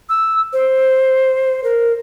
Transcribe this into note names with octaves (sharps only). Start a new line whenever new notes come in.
E6
C5
A#4